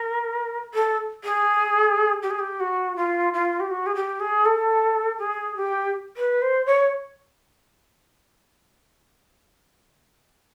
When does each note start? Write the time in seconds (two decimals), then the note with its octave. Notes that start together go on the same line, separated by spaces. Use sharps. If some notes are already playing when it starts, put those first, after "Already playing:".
Already playing: A#4
0.74 A4
1.24 G#4
2.22 G4
2.30 G#4
2.39 G4
2.60 F#4
2.96 F4
3.33 F4
3.60 G4
3.70 F#4
3.86 G#4
3.95 G4
4.20 G#4
4.45 A4
5.18 G#4
5.56 G4
6.17 B4
6.42 C5
6.66 C#5